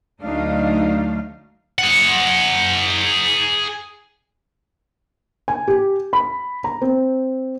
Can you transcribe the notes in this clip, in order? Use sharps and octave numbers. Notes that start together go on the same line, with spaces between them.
D2 F#3 A3 D4 D#4 F5
G#4 F#5
G#5
G4
B5
A#5
C4